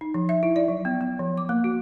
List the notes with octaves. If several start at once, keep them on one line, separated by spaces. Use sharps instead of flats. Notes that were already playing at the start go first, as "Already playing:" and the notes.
D#4
F3
E5
E4
D5
F#3
B3
B3
F3
D6
A#3
F#4